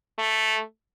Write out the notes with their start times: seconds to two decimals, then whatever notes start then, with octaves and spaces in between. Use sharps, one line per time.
0.18 A3